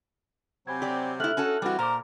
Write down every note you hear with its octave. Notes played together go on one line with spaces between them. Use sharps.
C3 F#3 C4 G#5 B5 G#6
G4 D5
A3 E4 F6 F#6 F#7
C#4 F#4 A4
E3 G3 C4 F#4
A#2 A#4 C5 A#5 D6